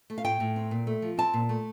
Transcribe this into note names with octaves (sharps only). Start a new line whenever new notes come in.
A3
F5
A2 G5
A2
C4
A#2
A3
F3
C4 A5
A#2
A3